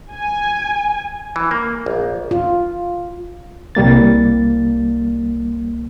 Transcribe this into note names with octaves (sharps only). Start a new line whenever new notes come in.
G#5
E3
A#3
A#1
F4
C2 G3 A#3 A6